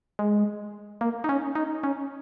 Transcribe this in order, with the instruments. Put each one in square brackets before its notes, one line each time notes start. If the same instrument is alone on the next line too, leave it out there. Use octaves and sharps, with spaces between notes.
[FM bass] G#3
A#3
D#4
C#4
D#4
C#4